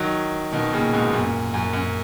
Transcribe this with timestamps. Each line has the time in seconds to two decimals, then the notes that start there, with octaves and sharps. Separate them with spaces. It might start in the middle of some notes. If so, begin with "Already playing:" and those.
Already playing: D#3 F#3
0.52 B2 D#3
0.73 A#2 C#3
0.93 G#2 B2
1.13 F#2 A#2
1.54 F#2
1.73 F#2